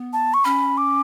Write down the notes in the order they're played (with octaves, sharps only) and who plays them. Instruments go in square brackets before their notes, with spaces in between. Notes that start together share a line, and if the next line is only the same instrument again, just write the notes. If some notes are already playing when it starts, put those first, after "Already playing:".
Already playing: [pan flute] B3
[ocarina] A5
C#6
[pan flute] C#4 [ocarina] B5
[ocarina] D6